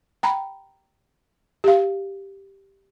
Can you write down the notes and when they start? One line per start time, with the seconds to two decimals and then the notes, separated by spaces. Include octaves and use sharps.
0.23 G5 A#5 B5
1.64 G4 F5